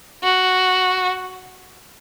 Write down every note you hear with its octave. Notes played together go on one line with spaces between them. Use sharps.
F#4